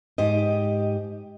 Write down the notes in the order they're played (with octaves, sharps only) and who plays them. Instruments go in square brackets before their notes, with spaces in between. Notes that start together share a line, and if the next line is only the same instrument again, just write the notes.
[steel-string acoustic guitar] G#2 G4 D#5